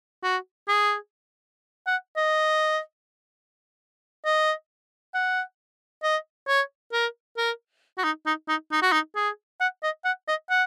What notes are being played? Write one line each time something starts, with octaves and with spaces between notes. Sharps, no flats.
F#4
G#4
F#5
D#5
D#5
F#5
D#5
C#5
A#4
A#4
F#4
D#4
D#4
D#4
D#4
F#4
D#4
G#4
F#5
D#5
F#5
D#5
F#5